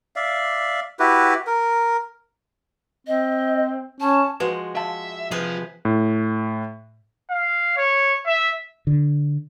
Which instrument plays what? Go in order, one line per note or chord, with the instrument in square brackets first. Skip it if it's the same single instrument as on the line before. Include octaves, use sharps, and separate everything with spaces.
[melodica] D5 E5 F5
E4 F#4 G4 B4
A#4
[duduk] C4 [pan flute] D#5
[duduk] C#4 [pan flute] A5
[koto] F3 G#3 [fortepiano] F#4 [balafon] B4
[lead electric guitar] E5 [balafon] F5 A5
[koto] C3 G#4 B4 [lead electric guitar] F3
[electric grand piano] A2
[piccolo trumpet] F5
C#5
E5
[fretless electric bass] D3